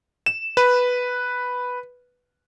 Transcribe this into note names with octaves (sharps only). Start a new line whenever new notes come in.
E7
B4